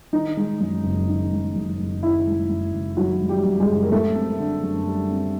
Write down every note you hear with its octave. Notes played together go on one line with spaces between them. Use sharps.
D#3 D#4
G#3
F#2
F#1
D#3
G#3
F#2
F#1
D#3 E4
G#3
F#2
F#1
D#3 F#3 F#4
G#3
G3 G4
F#2
G#3 G#4
F#1
A#4
G3 A3 A4
C4
D3
F#2
G3
C4